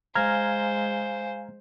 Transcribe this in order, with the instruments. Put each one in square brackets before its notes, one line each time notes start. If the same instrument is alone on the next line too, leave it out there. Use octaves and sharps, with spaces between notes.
[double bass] G#3 [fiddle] C5 [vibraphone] F5 G#5 [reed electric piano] A#5 F6 G#6